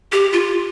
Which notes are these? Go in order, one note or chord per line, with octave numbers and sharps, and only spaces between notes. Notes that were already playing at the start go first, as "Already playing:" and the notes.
G4
F4